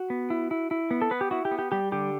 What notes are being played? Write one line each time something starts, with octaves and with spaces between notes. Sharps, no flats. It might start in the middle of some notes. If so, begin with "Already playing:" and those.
Already playing: F#4
B3
E4
E4
E4
B3
A4
B3 B4
G4
E4 F#4
G4
B3
G4
G3 G4
D3 G4